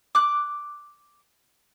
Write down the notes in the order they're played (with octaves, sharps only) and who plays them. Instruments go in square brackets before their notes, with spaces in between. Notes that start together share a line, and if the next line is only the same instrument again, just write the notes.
[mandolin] D6 F#6